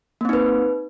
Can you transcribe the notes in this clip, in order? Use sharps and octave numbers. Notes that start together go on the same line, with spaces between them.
A#3 C4 D#4 B4